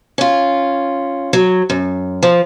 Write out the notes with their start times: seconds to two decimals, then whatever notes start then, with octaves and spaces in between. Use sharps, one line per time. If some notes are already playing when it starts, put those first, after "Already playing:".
0.18 C#4 F4
1.33 F#3
1.70 F#2
2.23 F3